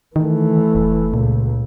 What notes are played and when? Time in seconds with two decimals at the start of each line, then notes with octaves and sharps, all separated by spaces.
0.16 D#3 E3 A3
0.75 F1
1.14 C#2 A#2